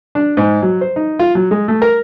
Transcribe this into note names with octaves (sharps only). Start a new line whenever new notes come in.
D4
G#2
F#3
C5
D#4
F4
F#3
G#3
A3
A#4